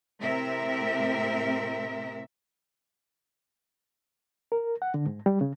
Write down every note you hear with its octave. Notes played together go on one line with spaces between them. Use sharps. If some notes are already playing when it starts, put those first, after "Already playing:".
A2 C3 C4 A#4 E5
A#4
F#5
D3
G#2
G3
C#3